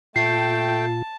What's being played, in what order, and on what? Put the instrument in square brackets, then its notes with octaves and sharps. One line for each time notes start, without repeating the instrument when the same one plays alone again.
[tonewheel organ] A#2 F4 [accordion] A3 G5 [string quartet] A5 [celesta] C7